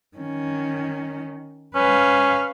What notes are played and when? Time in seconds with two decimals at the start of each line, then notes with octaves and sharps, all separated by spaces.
0.17 D#3 C#4
1.75 C#4 B4 F5